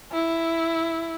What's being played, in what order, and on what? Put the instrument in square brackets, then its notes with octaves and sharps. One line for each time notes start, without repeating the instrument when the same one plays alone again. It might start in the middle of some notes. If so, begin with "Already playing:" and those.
[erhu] E4